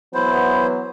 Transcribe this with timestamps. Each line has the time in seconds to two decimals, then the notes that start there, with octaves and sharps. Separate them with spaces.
0.14 E3 F#3 B3 E4 C5